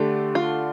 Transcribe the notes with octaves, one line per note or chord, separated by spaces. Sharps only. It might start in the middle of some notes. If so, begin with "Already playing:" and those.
Already playing: D3 A3 D4 G4
F4